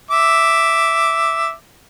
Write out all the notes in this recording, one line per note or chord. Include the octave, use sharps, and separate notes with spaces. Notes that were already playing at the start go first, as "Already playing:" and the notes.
E5 D6